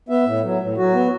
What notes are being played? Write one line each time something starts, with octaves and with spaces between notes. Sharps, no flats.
B3 E5
A2
F#3
A2
F#3 F#4
B3